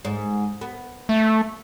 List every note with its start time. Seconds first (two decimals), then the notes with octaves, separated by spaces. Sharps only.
0.05 G#2
0.61 B3
1.09 A3